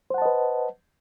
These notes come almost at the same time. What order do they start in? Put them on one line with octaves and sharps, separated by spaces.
C5 F#5 A5 D#5 B4